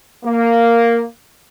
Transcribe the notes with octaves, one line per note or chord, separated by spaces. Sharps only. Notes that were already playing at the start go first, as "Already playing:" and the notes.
A#3